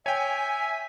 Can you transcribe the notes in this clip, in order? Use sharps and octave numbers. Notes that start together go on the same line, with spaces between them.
C#5 E5 G5 G#5 B6